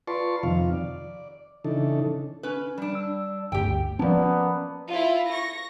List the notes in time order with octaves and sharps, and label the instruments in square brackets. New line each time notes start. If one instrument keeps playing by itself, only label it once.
[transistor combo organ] F4 B4 D5 A5 C6 C#6
F2 C3 D#3 F3 F5
D5
C#3 E3 D4 D#4 A4
[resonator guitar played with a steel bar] C#4 B4
G3 D4
[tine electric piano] E6
[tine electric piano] G1 D2 [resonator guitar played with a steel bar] G4 G5
[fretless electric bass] F3 C#4 [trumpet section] A#3 B3 [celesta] D5 A5
[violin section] E4 F4
C#6 A#6